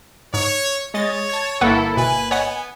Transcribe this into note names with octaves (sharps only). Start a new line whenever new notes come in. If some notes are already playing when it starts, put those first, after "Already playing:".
G#2 C#5
G#3 C#5 D#5 A6
A5 G#6
G1 A#3 E4 A4 B4 F#5 C#6
B2 B4 G#5
B3 C#5 D#5 F#5